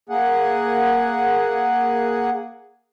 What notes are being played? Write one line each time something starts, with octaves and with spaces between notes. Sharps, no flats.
A#3 G#4 F#5